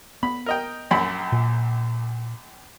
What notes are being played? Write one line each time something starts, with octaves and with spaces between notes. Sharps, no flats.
B3 B5
A#4 D#5 G5
A#1 F#2 B5
A#2